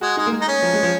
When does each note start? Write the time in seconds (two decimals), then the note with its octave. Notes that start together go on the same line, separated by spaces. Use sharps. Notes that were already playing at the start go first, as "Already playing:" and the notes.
0.01 G#3 F#4
0.17 G#3 D#4
0.26 A#3
0.32 G#3
0.41 D#4
0.48 C#4
0.62 F3
0.73 G#3
0.83 F3